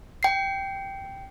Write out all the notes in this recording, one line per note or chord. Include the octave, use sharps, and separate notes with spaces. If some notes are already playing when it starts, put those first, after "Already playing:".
G5 C7